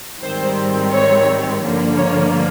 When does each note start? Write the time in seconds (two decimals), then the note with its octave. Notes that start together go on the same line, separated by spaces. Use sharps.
0.22 G#2 D#3 G3 C4 C5
0.92 C#5
1.62 G2 D3 F3 A#3
1.98 C#5